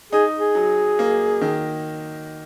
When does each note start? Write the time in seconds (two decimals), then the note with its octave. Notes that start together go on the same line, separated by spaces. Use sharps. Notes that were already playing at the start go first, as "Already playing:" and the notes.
0.12 D#4 G#4
0.38 G#4
0.55 F#3
0.99 A#3
1.41 D#3